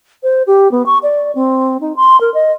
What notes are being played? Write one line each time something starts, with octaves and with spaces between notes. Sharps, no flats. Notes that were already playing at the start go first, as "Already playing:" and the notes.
C5
G4
B3
C#6
D5
C4
D#4
C6
A#4
D#5